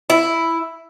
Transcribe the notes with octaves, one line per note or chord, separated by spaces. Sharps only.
E4